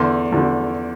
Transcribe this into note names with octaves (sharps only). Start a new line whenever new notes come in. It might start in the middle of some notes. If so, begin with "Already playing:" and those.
Already playing: E2 D3 C6
E2 D3